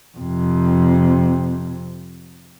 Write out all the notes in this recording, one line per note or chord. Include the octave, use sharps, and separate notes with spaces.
F2 C3